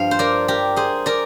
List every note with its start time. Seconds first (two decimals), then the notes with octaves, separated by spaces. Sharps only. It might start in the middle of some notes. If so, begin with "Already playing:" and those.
Already playing: G2 F3 F5
0.11 C5
0.19 A#4 D5
0.48 G4 A#4
0.76 G#4 C5
1.06 A#4 D5